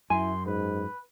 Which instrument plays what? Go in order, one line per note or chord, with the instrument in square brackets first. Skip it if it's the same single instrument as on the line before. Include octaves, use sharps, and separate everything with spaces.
[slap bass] F#2 [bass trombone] E4 [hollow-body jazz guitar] G#5 [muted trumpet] C6
[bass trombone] G#2 [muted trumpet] B4